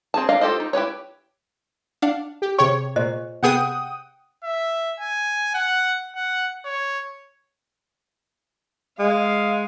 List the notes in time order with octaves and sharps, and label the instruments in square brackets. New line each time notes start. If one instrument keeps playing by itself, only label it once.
[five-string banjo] C4 G#4 A5
D4 D#5 F5
F4 G4 A4 C5 D#5
D#4
E4 G4 B4 C#5
[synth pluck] D4 F5 F#5
[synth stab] G4
[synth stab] C3 C#5 [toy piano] G#4 C#6 [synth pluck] G5
[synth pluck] A#2 [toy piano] C5 D#5
[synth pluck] C3 B3 G#4 [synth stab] F#5 G5 D#6
[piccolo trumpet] E5
G#5
F#5
F#5
C#5
[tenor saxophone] G#3 [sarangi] F5